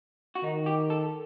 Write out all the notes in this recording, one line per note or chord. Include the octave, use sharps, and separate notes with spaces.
F#4
D#3 D#4
G4
A4